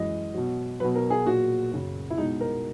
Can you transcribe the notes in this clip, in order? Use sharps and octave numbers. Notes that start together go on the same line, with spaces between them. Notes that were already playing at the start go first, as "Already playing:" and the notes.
Already playing: F#2 E3 G#3 D#5
B2 F#3
B2 F#3 B4
A#4
G#4
A#2 F#3 F#4
F#2 C#3 F#3
E4
B2 G#3 D#4
A#4